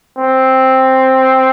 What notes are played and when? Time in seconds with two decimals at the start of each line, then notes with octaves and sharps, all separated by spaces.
0.17 C4